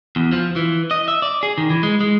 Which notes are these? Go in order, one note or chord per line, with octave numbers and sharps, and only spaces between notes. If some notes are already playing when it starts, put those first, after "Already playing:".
E2
F3
E3
D#5
E5
D5
G#4
D#3
E3
G#3
G#3